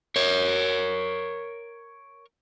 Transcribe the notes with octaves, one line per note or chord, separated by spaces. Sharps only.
A#4 C#5